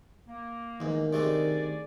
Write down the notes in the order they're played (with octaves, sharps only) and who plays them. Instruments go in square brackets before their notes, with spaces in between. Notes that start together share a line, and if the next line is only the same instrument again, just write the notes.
[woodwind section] A#3
[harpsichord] E2 G#2 [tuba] D#3
[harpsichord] C3 A3 D4 [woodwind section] G#4 D5